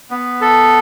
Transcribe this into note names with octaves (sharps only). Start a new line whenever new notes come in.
B3
A4